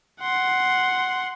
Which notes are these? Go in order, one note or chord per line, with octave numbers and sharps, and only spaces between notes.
F#5 C6